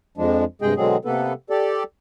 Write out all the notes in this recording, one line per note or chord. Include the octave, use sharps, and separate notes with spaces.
F2 F3 G#3 D4
G2 C3 G#3 G#4 D#5 G5
B2 D3 F#3 G#3 C4 G#4
C3 A#3 B3 A4 B4
G4 A4 D5